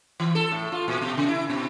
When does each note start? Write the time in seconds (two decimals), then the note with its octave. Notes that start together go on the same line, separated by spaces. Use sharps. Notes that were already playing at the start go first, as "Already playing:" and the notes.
0.20 E3
0.35 A4
0.52 A2
0.72 F4
0.88 A#2
1.02 B2
1.17 C#3
1.29 E4
1.49 B2